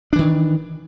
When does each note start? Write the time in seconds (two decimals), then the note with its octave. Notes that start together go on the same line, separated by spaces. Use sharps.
0.13 D4
0.16 E3
0.19 D#3